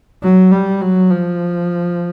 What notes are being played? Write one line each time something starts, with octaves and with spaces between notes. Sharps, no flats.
F#3
G3
F#3
F3